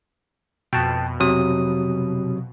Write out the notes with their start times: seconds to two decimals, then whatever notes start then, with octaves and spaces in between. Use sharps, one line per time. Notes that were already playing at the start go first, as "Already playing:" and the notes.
0.73 F2 B2 G5 A5
1.20 C3 F#3 D#6